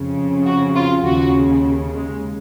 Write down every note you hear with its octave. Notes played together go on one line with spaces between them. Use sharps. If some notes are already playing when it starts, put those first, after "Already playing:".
Already playing: F2 C#3
F#4
F4
D#2 C#3 F#4
G#3